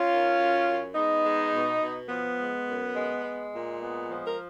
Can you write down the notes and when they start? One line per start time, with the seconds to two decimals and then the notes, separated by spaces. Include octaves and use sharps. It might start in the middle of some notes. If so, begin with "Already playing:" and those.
Already playing: C#4 F4
0.10 D#3
0.38 F#2
0.67 F#2
0.95 G#3 B3 D#4
1.24 G#3
1.52 B2
1.81 B2
2.09 F3 B3
2.38 G#3
2.67 F#2
2.96 G#3
3.24 G#3
3.53 A#2
3.81 G#3 B3
4.10 F3
4.27 A#4